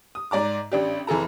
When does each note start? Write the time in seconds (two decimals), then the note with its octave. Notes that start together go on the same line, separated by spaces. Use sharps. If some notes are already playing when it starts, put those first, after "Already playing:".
0.15 D#6
0.31 G#2 D5 A#5 D6
0.72 A1 D4 G4
1.07 F1 E3 G#4 A4 A#5